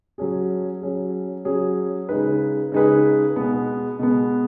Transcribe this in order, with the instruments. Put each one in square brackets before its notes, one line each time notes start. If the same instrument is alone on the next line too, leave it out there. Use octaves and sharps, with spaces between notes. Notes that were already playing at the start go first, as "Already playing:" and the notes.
[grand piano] F#3 C#4 G#4
F#3 C#4 G#4
F#3 C#4 G#4
C#3 G#3 D#4 G#4 B4
C#3 G#3 D#4 G#4 B4
B2 G#3 B3
B2 G#3 B3